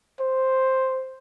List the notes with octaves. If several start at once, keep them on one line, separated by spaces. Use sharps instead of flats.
C5